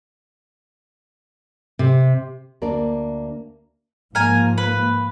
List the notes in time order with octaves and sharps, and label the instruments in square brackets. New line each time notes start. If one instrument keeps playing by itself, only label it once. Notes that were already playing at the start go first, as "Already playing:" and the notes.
[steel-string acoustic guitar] C3
[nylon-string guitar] D2 A#3 D4 D5
[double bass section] G#2 F3 A#3 [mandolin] A#4 G#5
[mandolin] B4